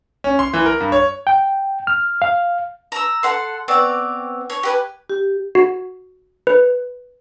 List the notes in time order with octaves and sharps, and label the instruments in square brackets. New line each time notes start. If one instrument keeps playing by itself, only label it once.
[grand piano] C#4
C6
E3
A#4
G2
C#5
[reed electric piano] G5
F6
F5
[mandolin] A#5 E6
A4 F#5 C6
B3 C4 C#5 D5
C#5
G4 B4 G#5
[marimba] G4
[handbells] F#4
B4